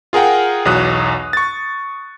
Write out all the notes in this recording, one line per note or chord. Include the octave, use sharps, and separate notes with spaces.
F4 G#4 A#4 F#5 G5
B1 E2 F#3 D#6 F#6
C#6 A6